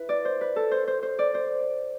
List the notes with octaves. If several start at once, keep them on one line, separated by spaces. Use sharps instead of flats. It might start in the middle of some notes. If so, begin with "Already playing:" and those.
Already playing: E4 B4
D5
C5
B4
A4
C5
C5
C5
D5
C5